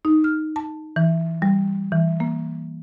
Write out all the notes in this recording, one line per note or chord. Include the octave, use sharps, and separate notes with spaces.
D#4
F6
A5
E3
G3
E3
A#3